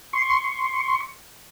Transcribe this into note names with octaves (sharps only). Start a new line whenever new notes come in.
C6 C#6